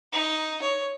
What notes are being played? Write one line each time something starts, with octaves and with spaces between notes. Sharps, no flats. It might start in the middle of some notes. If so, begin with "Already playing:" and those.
D#4
C#5